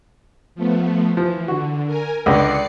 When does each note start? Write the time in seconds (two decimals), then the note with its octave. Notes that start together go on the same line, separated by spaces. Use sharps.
0.55 F3 A3 B3
1.17 E3 F3
1.48 D3 F#4
1.87 A#4 G#5
2.26 C#2 D3 D5 C7 C#7